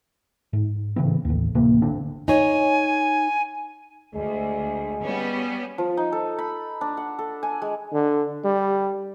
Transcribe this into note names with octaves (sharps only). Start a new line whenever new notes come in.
G#2
A2 C#3 E3 C4
A1 D#2
D1 A1 C3 A#3
G#1 D3 C4 D4
D#4 C#5 G#5
D2 G#3
G3 B3 C#4
F3
D#4
A4
B5
D4
F#5
A4
G#5
G#3
D3
G3